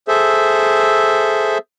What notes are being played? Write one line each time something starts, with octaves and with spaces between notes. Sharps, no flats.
G#4 A4 C5 E5